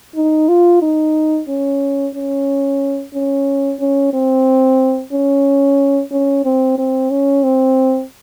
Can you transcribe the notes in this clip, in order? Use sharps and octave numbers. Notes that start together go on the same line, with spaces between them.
D#4
F4
D#4
C#4
C#4
C#4
C#4
C4
C#4
C#4
C4
C4
C#4
C4